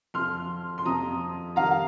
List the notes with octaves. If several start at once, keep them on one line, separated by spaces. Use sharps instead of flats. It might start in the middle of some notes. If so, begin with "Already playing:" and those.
F2 F3 C6 F6
C6
F2 C3 F3 A#5 D#6
F2 D#3 G3 F5 A#5